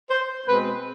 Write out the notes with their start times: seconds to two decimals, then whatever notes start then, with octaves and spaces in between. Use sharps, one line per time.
0.11 C5
0.47 B2 G#3 C4 B4